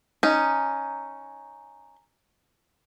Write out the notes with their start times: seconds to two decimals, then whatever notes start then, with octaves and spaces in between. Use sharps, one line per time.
0.23 C#4 D#4